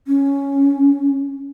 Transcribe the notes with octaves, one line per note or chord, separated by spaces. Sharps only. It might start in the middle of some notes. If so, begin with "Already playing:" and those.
C#4